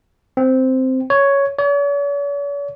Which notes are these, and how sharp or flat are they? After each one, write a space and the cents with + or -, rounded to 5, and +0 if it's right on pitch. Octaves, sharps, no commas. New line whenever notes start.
C4 -5
C#5 +5
C#5 +45